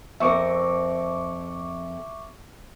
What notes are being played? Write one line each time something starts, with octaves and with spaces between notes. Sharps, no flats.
F2 C4 A#4 E5 C#6 D6